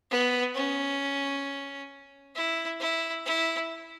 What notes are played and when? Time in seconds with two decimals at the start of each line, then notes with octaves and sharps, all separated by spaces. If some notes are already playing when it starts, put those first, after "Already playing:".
0.10 B3
0.54 C#4
2.35 E4
2.80 E4
3.25 E4